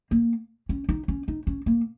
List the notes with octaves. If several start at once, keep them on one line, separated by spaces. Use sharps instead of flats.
A#3
C#4
D#4
C#4
D#4
C#4
A#3